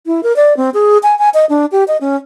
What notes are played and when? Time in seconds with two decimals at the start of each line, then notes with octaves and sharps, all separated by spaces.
0.06 E4
0.23 A#4
0.36 D5
0.57 C4
0.74 G#4
1.03 G#5
1.19 G#5
1.34 D#5
1.49 D4
1.72 G4
1.88 D#5
2.01 C#4